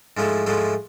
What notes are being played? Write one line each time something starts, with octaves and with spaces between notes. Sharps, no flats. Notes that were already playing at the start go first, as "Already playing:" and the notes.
G#2 F3 A3 E4
G#2 F3 A3 E4